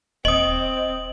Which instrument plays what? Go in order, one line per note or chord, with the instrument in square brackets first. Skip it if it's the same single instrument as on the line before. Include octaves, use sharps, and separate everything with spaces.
[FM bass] D#1 [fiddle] C4 [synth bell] D#5 D#6 [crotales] F#7